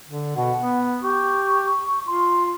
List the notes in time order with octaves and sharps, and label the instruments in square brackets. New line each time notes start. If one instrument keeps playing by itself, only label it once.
[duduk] D3
[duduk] B2 [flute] F#5
[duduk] B3
[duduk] G4 [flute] C#6
[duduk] F4 [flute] C6